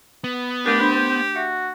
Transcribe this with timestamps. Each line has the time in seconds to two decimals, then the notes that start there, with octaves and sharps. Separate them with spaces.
0.24 B3
0.66 A3 D4 G4 A#4
0.80 D4 C5 B5
1.36 F#4 E5